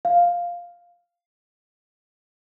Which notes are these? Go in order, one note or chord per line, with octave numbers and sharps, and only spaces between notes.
F5